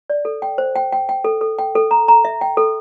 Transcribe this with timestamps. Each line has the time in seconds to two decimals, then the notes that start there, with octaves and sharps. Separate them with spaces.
0.10 D5
0.25 A4
0.42 G5
0.58 C5
0.76 G5
0.92 G5
1.09 G5
1.24 A4
1.41 A4
1.58 G5
1.75 A4
1.91 A#5
2.08 A#5
2.25 E5
2.41 G5
2.57 A4